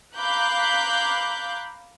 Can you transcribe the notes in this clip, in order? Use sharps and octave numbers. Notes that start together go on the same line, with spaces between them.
F5 A#5 B5 D6 F#6 G6